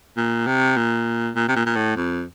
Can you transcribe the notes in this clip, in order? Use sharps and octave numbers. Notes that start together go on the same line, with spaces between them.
A#2
C3
A#2
A#2
C3
A#2
A#2
A2
F2